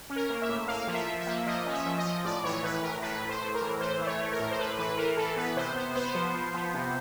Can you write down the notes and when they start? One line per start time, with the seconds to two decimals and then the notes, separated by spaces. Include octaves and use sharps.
0.10 C#4
0.16 A#4
0.30 A#3
0.42 E5
0.49 A2
0.68 A#3 F5
0.87 F3
0.94 E5
1.07 F3
1.21 E5
1.27 A#3
1.47 F3 D#5
1.66 C#4
1.73 E5
1.86 F3
1.98 D#5
2.05 F3
2.25 A2 D5
2.44 E3 C#5
2.63 A2 B4
2.83 A2 A#4
3.02 A2 B4
3.22 A2
3.29 C5
3.42 A2
3.55 A#4
3.61 E3
3.80 E3 C5
4.01 A3
4.07 C#5
4.19 A3
4.32 A#4
4.40 A2
4.51 C5
4.58 A2 B4
4.79 E3 B4
4.97 E3 A#4
5.17 E3 A4
5.36 B3 B4
5.56 C3 C5
5.76 B3 C5
5.95 B3 C5
6.15 F3
6.35 F3
6.54 B3
6.74 C3